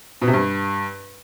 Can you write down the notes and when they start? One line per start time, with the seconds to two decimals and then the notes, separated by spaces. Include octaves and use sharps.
0.22 B2
0.27 C3
0.33 G2